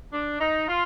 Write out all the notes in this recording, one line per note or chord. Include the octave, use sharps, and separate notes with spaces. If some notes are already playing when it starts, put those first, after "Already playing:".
D4
D#4
F4